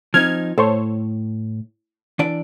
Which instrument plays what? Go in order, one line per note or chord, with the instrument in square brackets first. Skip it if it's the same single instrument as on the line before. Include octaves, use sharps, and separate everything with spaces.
[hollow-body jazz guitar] F3 C4 D#4 [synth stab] F6 G#6
[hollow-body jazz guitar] A2 [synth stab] A4 C5 C#5
[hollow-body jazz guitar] E3 D4 D5